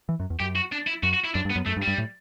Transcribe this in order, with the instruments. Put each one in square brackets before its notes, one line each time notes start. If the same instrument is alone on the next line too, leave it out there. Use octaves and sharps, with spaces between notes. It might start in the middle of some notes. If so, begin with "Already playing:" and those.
[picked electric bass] E3
F#2
E2
[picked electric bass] F#2 [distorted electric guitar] G4
[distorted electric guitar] F#4
D4
E4
[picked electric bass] F#2 [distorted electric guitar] F#4
[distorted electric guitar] F#4
E4
[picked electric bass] F#2 [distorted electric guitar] D4
[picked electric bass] G2
[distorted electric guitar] B3
[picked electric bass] F#2
[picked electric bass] F#2 [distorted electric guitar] A3
[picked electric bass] G2
[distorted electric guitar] G3
[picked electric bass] G2
A2